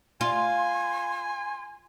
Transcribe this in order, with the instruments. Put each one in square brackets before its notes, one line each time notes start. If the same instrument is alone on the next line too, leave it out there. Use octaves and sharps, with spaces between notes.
[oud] F4 [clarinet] G#5 [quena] C6